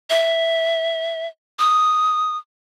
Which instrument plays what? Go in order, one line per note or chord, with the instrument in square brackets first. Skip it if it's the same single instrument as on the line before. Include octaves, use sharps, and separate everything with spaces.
[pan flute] E5
D#6